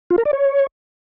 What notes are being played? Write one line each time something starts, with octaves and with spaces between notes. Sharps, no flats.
F4
A#4
D5
C#5